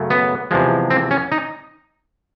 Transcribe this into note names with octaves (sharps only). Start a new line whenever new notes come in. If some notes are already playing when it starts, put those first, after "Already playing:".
Already playing: F#2 C#3 F#3 A3
B3
E2 C3 F3 G#3
C4
C#4
D#4